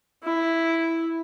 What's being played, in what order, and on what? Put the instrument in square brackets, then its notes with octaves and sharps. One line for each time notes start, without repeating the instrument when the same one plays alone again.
[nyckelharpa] E4